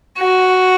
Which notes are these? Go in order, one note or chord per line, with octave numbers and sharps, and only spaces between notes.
F#4